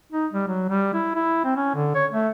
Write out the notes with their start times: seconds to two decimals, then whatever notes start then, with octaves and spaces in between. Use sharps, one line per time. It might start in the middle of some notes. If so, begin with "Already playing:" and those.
0.12 D#4
0.33 G3
0.48 F#3
0.69 G3
0.94 E4
1.15 E4
1.44 C4
1.57 C#4
1.75 D3
1.95 C#5
2.12 A3